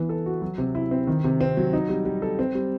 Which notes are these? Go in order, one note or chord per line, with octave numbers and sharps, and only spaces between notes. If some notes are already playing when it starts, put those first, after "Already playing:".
Already playing: E3 B3
A4
F#4
F#3
C3
E4
C4
D#3
C3
C4
F#3
D#4
G3
G3
A4
C4
G3